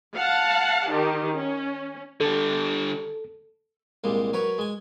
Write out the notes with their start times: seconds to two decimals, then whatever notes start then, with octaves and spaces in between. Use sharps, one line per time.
0.15 F5 F#5 A5
0.89 D#3 G4
1.34 C#4
2.21 D3 G3 A4
4.04 C2 A#2 G3 G#3
4.33 F#3 A#4 B4 C#5
4.58 G#3 G#5